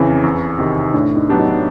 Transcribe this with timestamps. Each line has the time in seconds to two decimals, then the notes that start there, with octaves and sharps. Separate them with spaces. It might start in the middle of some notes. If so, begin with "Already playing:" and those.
Already playing: F2 C#3 E3 C4
0.24 E2
0.59 C3 D#3
0.94 A2 D4
1.17 D#4
1.29 F#3 B3 D4 G4
1.40 D#4